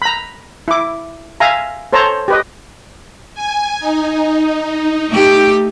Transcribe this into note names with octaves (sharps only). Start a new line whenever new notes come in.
A#5 B5
E4 D6
E5 F5 G#5 A#5
A4 C5 C#5 A5 A#5
G4 B4 D#5
G#5
D#4
A3 G4